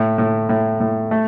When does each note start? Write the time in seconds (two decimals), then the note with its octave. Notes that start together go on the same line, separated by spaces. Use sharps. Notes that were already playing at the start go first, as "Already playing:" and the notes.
Already playing: A2
0.18 A2
0.49 A2
0.80 A2
1.11 A3